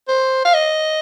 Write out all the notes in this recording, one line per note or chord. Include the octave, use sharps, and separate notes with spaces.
C5
F5
D#5